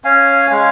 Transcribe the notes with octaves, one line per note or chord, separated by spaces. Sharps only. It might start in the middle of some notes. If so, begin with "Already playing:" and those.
C#4 F5 G#5
G#3 F5 G#5